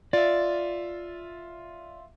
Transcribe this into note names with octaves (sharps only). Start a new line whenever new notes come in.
F4 D5 E5